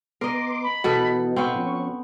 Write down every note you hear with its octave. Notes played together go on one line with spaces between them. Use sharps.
B3 A#4 D#5 C6 D6
B5
B2 E3 B3 D#4 A4
B2 B3 C4 D#4 F5 C#6
F3 C#4